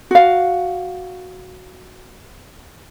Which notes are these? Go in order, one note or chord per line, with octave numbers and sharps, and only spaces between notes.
F#4 F5